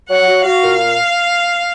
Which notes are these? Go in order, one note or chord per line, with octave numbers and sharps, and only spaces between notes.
F#3 F#5
F#4
F#4 F5
A#2